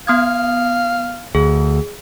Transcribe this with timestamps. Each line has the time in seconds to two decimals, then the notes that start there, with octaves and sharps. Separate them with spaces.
0.07 B3 F5 D#6 G#6
1.35 D2 G#4